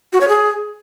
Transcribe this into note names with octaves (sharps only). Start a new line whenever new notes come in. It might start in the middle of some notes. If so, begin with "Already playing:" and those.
F#4
C#5
G#4